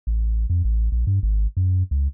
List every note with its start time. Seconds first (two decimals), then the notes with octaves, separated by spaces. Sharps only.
0.07 A1
0.50 F2
0.64 A1
0.92 A#1
1.07 G2
1.23 G#1
1.57 F#2
1.91 C#2